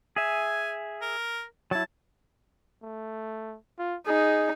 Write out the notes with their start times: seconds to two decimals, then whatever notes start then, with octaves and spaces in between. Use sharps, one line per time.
0.16 G#4 E5 G#5
1.02 A#4
1.71 F#3 E4 A5
2.82 A3
3.78 F4
4.07 D#4 G#4